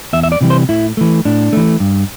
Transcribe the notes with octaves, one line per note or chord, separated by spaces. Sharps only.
E2 E5
E5
D5
C3 E3 G3
C5
A2 E4
E3 A3
A2 D4
E3 A3
G2